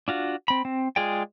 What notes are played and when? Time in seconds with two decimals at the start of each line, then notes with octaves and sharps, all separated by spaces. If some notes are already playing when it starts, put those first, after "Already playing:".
0.08 D4 F4 F#4
0.48 C4 B5
0.65 C4
0.96 G#3 F4 G#4 D5 G5